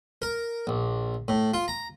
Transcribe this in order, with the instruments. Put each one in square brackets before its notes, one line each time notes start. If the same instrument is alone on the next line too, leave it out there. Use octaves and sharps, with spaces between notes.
[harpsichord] A#4
A#1
A2
F4
A#5